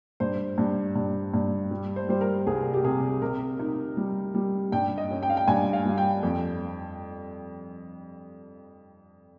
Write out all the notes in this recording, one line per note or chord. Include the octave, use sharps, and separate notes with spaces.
G2 C5
G2
G2
G2
G3
C5
G3 C5
A#4
C2 G#4
G4
C3 G#4
C3 A#4
D#4
G3
G3
G2 G5
D#5
C#4
G5
F5
G5
G2 G#5
F5
G3
G5
F2